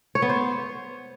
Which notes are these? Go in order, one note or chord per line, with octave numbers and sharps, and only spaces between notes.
C#5
B3
C5